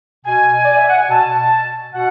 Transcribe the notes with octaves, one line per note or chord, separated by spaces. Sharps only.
B2 G#5
D5
E5
F#5
G#5
B2 A5
B2 F#5